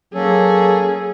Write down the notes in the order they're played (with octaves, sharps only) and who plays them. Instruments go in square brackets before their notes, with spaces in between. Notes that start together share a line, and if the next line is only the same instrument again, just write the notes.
[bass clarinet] F#3 [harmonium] A#3 C#4 A4 [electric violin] G#4